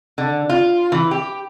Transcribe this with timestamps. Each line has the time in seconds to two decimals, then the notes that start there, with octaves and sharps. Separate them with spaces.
0.18 D3
0.49 F4
0.92 E3
1.11 G4